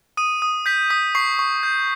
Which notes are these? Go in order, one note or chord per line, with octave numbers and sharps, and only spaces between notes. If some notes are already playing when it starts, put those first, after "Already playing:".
D#6 D#7
D#6
G6 B6
D#6 B6
C#6 C7
C#6
G6